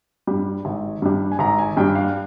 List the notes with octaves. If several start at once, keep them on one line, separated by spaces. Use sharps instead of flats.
G2 G3
G#1
G2 G3
G#5
G#1 A#5
G#5
G2 G3 G5
F5